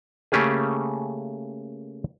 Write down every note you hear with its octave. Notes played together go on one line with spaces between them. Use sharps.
C#3 A3 A#3 C#4 G4 G#4